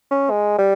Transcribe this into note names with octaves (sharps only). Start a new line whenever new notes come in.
C#4
G#3
G3